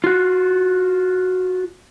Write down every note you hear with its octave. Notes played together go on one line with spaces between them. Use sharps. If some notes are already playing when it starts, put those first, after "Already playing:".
F4 F#4